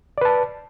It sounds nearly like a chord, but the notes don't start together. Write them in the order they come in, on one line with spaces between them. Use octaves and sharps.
D5 B4 A5